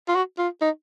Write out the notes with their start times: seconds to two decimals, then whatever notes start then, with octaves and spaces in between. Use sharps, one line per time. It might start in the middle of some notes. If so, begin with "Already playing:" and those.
0.08 F4
0.15 F#4
0.38 F4
0.61 D#4